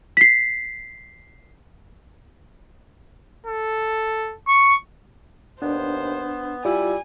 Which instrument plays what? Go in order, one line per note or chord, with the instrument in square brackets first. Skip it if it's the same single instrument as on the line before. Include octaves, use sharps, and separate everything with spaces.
[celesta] B6 C7
[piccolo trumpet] A4
C#6
[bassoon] D#2 [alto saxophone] B3 [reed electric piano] D4 [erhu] C5
[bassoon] G3 [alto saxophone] E4 [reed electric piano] F4 [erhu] G#5